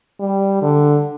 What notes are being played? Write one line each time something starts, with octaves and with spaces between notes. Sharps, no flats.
G3
D3